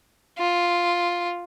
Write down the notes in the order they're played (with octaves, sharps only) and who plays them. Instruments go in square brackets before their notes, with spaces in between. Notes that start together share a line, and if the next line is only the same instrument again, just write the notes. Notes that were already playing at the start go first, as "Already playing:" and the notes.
[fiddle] F4